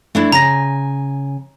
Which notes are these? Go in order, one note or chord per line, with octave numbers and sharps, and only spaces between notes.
A3 D4 E4
C#3 G#5 A#5 A#6